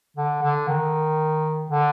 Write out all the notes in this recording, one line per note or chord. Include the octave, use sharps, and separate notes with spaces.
D3
D3
D#3
D3